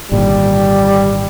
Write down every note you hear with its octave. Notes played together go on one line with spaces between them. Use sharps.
G#1 A#2 D3 G3